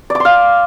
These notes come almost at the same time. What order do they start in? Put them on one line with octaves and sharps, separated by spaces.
D5 D6 C6 F5